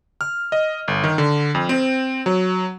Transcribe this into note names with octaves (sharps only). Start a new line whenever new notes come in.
F6
D#5
G1
D#3
D3
F2
C4
F#3